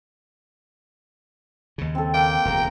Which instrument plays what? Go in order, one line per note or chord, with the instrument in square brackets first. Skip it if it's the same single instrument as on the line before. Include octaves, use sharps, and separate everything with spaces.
[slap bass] D#2 C#3
[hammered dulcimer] C4 A4
[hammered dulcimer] A#3 [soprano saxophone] G5
[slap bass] E1 D2 C#3 [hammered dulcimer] A#5